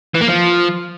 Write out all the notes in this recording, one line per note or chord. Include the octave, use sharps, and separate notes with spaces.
E3
A#3
F3